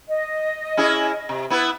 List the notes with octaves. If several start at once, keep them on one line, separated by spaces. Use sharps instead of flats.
D#5
C#4 E4 G#4
C3
B3 E4 B4